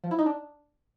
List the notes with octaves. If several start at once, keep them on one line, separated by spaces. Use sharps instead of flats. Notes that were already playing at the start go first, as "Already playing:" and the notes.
F3
E4
D#4
D4